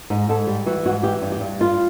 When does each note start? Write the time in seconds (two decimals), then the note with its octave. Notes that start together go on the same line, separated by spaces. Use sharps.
0.10 G#2 D#4
0.29 G#2 A4
0.47 G3
0.66 E3 F#4
0.86 G#2 F#4
1.03 E3 G4
1.22 G2
1.32 G4
1.41 G2
1.60 G3 F4